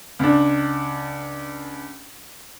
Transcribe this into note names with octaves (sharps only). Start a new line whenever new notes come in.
C#2 D4